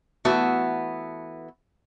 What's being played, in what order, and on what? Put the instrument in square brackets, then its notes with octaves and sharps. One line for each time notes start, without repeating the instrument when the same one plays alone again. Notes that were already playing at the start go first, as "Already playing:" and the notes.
[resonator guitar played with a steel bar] E3 A3 B3 F#4 E5